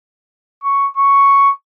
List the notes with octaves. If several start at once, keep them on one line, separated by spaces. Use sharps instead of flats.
C#6
C#6